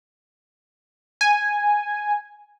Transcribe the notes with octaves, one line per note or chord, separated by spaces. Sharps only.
G#5